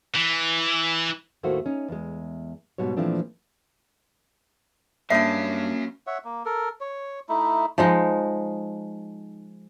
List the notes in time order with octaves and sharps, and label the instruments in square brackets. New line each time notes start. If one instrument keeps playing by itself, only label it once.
[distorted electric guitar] E3
[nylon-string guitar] D#2 A2 A3 A#3 F#4 C5
C#4 D#4
E2 G#3
G#2 B2 G3 C#5
A#2 E3 F3 A3 C4 D4
[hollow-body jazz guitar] G2 D4 [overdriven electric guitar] F#3 C#4 [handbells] A#3 C7 [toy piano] E5
[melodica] C#5 E5 F#5
A#3
A4 A#4
C#5
A3 D#4 E4
[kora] F3 G#3 D#4